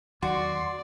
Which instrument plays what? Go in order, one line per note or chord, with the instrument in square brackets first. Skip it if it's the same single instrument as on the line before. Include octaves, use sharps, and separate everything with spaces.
[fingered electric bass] E2 D#3 F#3 [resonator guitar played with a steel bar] F#4 [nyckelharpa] D5 [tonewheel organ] C6